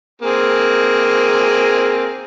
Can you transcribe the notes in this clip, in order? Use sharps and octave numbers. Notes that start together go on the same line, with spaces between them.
A#3 C4 G#4